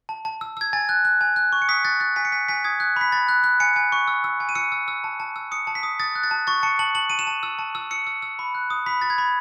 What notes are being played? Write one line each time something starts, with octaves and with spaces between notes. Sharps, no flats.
A5
A5
E6
E6 G#6
G#5 A6
F#6
F#6
G#5
F#6
C#6
C#7
D#6 B6
F#6 A6
F#6 A6
G#5 B6
C#7
G#5 B6
G#5 B6
D#6 G#6
F#6
B5 B6
B5 A6
F#6
F#6
G#5 C#7
G#5
C#6
E6
E6
G#5
D#7
E6 C#7
E6
E6
A5
A5
E6
D#6 C#7
A5
B6
D#6
D#6 A6
F#6
A6
A5
C#6 A6
A5 C#7
A5 F#7
A5 F#7
A5 D#7
E7
A5
E6
A5
E6
E6 C#7
E6
E6
B5
F#6
D#6
B5 B6
B5 A6
G#6
B5